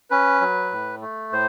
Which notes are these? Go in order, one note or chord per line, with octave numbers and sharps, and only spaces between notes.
C#4 B4
F#3
A2
A3
A2 C5